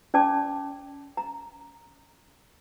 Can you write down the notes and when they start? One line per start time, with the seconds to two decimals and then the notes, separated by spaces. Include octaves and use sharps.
0.14 C#4 D5 A5 D6
1.17 A#5